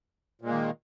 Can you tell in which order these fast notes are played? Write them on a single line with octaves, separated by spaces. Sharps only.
A#2 G#3 A#3 D#3